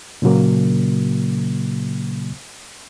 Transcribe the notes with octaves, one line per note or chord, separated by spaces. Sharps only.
A#2 C#3 F#3 A#3